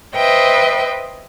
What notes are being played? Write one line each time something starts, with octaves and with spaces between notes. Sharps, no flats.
B4 C5 D#5 E5 G5